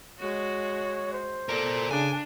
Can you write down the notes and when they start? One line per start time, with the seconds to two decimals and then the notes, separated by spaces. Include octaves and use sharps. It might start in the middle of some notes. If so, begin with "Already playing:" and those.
0.19 G#3 F#4 C#5
1.12 C5
1.49 A4 A#4 D5
1.91 C#3 D4 G#5